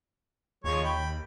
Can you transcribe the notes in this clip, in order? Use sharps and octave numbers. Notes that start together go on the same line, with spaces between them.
D#2 F3 G#3 C#5
G5 B5